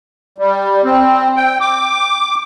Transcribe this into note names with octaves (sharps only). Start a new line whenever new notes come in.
G3
C4
G5
D6